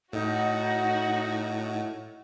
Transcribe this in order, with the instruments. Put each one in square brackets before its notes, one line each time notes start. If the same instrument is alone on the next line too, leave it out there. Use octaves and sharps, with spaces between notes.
[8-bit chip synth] A2 [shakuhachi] D#4 [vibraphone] E4 D#5 [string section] F#4